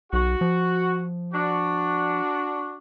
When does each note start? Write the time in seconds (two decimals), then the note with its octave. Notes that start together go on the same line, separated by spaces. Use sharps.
0.13 B1 F#4
0.41 F3
1.34 D4 F#4